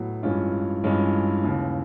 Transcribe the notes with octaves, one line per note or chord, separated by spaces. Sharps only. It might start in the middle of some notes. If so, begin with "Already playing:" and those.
Already playing: A2 F#3 B3
G2 E3 G#3 C#4 F4
G2 E3 G#3 C#4 F4
D#2 C#3 E3